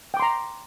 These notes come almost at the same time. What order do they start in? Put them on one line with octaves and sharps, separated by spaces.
G5 D6 C6 A#5